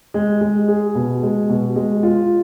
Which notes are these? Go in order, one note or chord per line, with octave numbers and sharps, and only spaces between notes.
G#3
G#3
G#4
B2
G#3
B2
G#3
F4